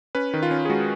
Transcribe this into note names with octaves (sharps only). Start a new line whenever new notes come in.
C#4 B4
D#3
F4
C#4
G#4
G#3 F#4